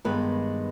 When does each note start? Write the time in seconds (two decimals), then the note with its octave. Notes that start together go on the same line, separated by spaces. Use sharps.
0.05 G2 D#3 G#3 B3 B4